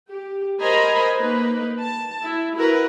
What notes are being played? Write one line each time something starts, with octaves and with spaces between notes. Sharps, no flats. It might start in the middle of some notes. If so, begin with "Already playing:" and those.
G4
A#4 C5 D#5 G#5 A#5 B5
A#3 D#4 B4
A5
E4
E4 F#4 A#4 B4